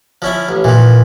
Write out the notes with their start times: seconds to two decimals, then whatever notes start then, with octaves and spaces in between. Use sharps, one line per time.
0.22 F3 C#4 E4
0.49 A1
0.64 A#2 E3 F3